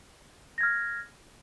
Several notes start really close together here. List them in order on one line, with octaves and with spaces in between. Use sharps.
A#6 G#6 F6